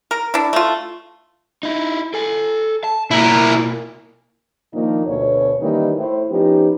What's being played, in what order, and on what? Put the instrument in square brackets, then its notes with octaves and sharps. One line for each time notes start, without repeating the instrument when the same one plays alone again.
[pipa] A#4
D4 E4
A3 F4
[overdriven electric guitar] D#4 E4
A4 G#5
A5
[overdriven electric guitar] B2 A#3 [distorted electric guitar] E4 A#4
[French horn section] A#2 D#3 F3 A#3 D4 D#4
D2 B2 C#5
D#3 E3 G3 A#3 C#4 D#4
A2 E4 C5
F3 B3 C#4 D#4 G4